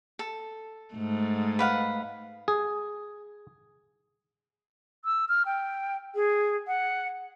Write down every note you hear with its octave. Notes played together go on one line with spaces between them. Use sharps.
A4
G#2 A3
B4 F5 F#5
G#4
E6
F6
G5
G#4
F#5